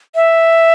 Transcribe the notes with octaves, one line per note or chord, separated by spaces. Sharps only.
E5